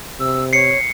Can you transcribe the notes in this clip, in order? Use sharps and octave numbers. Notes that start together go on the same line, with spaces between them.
C3 E6
C#5 C7 C#7